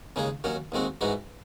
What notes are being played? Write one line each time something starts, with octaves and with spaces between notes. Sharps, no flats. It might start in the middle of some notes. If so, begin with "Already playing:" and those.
D#2 C#3 G#3 D#4 G#4
D#2 D#3 F#3 C#4 F#4
D#2 D#3 G#3 C4 F#4
G#2 E3 G#3 D#4 F#4